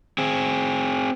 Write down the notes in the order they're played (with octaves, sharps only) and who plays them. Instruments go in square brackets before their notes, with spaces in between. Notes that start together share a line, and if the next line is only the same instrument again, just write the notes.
[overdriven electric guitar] C4 G#4